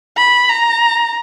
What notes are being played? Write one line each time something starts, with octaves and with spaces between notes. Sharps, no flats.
B5
A#5